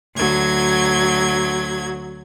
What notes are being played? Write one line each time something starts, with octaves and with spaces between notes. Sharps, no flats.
D2 F#3 G#6